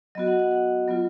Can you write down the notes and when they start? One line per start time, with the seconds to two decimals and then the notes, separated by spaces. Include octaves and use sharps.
0.15 F#3 B3 F#4 D#5
0.27 F#5
0.39 F#5
0.51 F#5
0.88 F#3 B3 F4